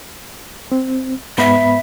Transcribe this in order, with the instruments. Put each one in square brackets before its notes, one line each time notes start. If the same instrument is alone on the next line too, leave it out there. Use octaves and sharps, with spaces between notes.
[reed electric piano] C4
[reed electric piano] G#2 B3 B5 [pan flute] E5